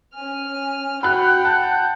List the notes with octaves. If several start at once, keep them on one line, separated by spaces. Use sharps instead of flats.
C#4 G#5 F6
F#4 F#5 G5 B5 F#6
A5 G6